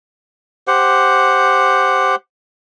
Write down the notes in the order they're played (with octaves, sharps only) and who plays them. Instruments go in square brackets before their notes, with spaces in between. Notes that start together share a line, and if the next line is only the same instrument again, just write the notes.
[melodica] G4 C5 F#5